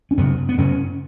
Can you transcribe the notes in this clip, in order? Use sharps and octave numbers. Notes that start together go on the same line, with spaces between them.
C#4
F#2 C#3 B3
B3
F#2 C#3 C#4